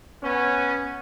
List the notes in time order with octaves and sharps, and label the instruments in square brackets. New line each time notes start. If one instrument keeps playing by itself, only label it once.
[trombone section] B3 C#4